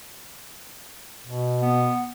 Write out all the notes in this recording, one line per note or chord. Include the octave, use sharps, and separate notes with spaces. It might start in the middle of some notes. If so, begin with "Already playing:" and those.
B2
B3